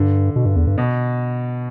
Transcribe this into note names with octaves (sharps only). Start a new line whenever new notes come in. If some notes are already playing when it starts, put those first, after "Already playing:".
Already playing: G2 D3
B2
G2
E2
G2
B2